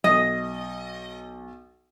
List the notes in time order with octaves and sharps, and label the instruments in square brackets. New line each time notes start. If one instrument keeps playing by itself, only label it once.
[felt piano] B1 [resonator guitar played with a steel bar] D#5